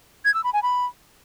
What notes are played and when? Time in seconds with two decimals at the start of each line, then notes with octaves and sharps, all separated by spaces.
0.25 G#6
0.34 E6
0.44 B5
0.53 G#5
0.63 B5